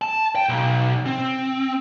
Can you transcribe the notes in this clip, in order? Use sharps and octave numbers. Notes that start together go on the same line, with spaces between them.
A5
G5
B1
C4